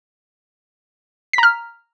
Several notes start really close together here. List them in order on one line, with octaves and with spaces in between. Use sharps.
B6 A#5 F6